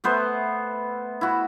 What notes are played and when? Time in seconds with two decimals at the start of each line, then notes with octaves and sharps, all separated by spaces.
0.04 A3 B3 C5 E5
1.21 E4 F#4